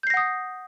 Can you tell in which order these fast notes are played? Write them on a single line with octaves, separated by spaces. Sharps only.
G6 C7 A#6 F#5 D#6